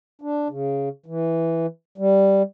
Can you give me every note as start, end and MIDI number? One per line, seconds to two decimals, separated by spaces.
0.21 0.48 62
0.49 0.89 49
1.06 1.66 52
1.98 2.42 55